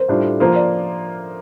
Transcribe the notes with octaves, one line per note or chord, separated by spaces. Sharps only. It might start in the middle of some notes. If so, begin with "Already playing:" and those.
Already playing: A#4 C5
A2 G3 D4 F4
F3 A#3 F4 C5
D5